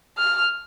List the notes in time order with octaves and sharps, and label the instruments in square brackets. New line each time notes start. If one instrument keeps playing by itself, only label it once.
[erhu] F6